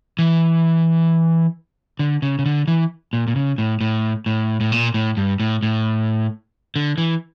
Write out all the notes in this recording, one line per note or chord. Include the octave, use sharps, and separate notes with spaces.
E3
D3
C#3
C#3
D3
E3
A#2
A#2
C#3
A2
A2
A2
A2
A#2
A2
G2
A2
A2
D3
E3